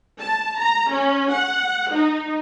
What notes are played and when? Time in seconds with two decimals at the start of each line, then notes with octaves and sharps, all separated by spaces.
0.19 A5
0.59 A#5
0.91 C#4
1.31 F#5
1.91 D#4